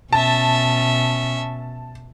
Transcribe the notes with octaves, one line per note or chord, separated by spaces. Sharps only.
B2 C#4 E5 A5